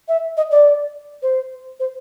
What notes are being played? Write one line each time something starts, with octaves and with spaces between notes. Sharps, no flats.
E5
D#5
D5
C5
C5